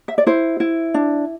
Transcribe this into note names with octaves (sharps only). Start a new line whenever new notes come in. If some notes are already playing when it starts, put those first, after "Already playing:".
E5
D5
E4 C5
E4
D4